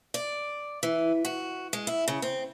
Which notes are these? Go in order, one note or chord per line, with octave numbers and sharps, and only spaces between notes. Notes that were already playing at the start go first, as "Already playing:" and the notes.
D5
E3
F#4
G#3
E4
C#3
C4